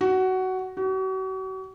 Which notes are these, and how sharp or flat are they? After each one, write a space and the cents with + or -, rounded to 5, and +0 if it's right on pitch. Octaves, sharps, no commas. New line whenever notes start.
F#4 +15
F#4 +40